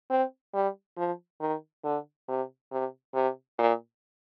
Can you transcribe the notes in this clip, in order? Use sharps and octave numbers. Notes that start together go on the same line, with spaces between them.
C4
G3
F3
D#3
D3
C3
C3
C3
A#2